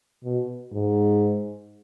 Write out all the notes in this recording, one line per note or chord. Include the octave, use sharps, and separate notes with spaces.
B2
G#2